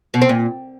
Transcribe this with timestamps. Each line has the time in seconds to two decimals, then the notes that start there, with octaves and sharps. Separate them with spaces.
0.14 B2
0.22 C4
0.29 A#2